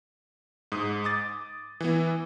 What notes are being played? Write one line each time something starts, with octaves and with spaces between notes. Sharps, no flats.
G#2 D#6
D6 D#6 A6
E3 B3